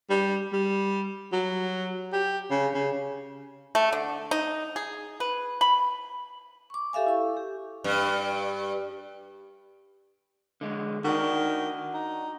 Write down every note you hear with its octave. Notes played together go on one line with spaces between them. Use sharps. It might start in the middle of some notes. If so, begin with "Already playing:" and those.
G3
G3
F#3
G4
C#3
C#3
A3
D3
D#4
G#4
B4
B5
C#6 D6
G4 A4 E5 F5 G#5
E4 C#6
G4
G2
D3 G#3
D#3 D4 F#4
D#4